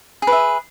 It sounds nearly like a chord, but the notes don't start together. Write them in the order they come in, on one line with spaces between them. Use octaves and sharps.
G#4 B4 E5